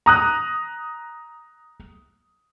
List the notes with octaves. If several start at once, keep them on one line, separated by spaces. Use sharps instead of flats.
A#5 D#6 F#6